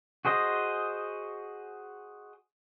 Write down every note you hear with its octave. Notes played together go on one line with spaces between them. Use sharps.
F#4 G#4 C5 D#5